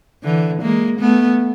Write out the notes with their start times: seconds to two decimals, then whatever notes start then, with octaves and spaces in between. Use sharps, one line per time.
0.24 D3 E3
0.62 G#3 A#3
1.00 A3 B3